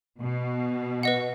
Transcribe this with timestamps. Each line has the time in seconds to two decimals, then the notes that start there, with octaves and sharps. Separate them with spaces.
0.20 B2
1.03 B4 D#5 F#5